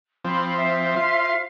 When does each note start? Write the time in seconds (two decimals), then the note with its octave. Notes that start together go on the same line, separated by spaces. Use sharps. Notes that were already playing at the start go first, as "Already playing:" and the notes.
0.24 F3 C4 B5 C6
0.56 C5 E5
0.96 F4 C6